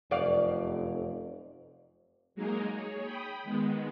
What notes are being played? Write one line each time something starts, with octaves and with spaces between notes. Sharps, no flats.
F1 F#2 D5 F5
F#3 G#3 A#3 D#4 G#4 A#4
G#4 C#5
G5 B5 D#6
D#3 G#3 B3